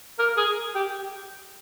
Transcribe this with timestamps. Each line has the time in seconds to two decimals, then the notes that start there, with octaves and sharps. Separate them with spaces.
0.19 A#4
0.37 G#4
0.75 G4